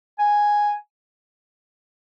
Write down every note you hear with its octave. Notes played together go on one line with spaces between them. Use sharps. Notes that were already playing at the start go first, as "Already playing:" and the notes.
G#5